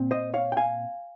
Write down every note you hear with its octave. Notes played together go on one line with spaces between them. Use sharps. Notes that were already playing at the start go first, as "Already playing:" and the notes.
Already playing: A#2 C4
C5 D#5
C#5 F5
G5
F5 G#5